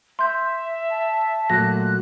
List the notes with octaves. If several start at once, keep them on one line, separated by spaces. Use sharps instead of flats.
E5 C6 G6
A5
A#2 F#3 A3 F#6 A#6